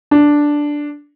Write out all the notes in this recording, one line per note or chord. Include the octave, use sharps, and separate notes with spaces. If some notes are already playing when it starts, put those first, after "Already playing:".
D4